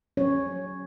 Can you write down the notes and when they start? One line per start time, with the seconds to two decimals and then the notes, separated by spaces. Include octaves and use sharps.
0.17 F#3 C#4 C#5